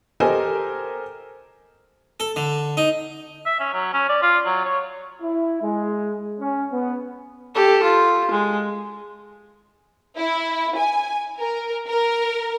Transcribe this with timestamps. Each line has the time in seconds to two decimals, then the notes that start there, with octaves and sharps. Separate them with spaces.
0.20 G4 A4 A#4 C5 D#5 G#5
2.20 A4
2.36 D3
2.77 D#4
3.46 E5
3.60 C#4
3.73 F#3
3.93 C#4
4.09 D5
4.22 F4
4.46 F#3
4.65 C#5
5.22 E4
5.62 G#3
6.40 C#4
6.72 B3
7.54 G4 A4
7.83 F4
8.31 G#3
10.17 E4
10.77 G#5
11.38 A#4
11.88 A#4